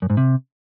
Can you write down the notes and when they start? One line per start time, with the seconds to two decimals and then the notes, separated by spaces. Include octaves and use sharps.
0.02 F#2
0.10 G#2
0.17 C3